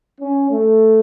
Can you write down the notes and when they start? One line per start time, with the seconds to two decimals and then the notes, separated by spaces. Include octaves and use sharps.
0.20 C#4
0.51 A3